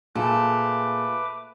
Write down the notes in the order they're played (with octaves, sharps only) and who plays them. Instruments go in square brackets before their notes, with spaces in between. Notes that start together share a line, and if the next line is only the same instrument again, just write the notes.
[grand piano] A#2 [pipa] A3 [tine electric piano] G#4 F5 G#5 [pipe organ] B4 D6